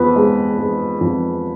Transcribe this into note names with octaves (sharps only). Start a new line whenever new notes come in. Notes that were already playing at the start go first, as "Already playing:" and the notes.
Already playing: F2 F3 B3 B4
G#3
G#3
F2